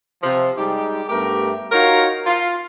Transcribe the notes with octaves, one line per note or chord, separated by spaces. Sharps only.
C3 F3
G3 G#3 D#4 G4
G2 A3 B3 G4 A#4
D#4 F4 F#4 A#4 C#5 F5
F4